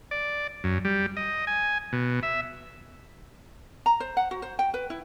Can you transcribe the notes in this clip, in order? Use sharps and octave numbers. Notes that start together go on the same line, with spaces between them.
D5
F#2
G3
D#5
G#5
B2
E5
A#5
C5
F#5
F#4
C5
G5
B4
E4